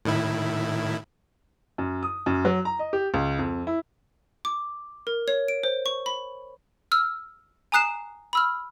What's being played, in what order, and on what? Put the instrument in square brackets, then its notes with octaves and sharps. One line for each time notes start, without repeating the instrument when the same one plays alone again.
[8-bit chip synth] A2 D#3 E4
[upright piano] F#2
D#6
F#2
F#3
A#5
D#5
G4
C#2
F2
E4
[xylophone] D6
A#4
C#5
D7
C5
C#6
B5
E6 F6
G#5 A#5 D#6 F#6 C7 E7
B5 E6 F6